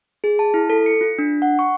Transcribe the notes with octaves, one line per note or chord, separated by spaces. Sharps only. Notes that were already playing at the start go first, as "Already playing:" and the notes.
G#4
A5
E4
A4
C#7
F4
D4
F#5
C#6